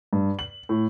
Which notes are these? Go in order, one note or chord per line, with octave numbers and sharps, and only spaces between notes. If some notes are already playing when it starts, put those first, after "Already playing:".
G2
F#7
A2